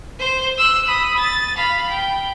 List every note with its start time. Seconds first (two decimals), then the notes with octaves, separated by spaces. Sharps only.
0.19 C5
0.58 E6 F#6
0.88 B5 D#6
1.18 A6
1.56 F5 B5
1.90 G5